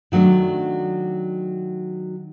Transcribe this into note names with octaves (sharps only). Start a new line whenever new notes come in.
D#3 F#3 A3 C#4 D4